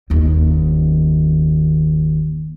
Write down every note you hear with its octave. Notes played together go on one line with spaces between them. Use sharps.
F#1 D#2